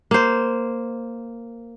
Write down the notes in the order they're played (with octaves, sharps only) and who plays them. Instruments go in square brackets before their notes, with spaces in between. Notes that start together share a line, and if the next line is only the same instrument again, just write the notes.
[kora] A#3 C5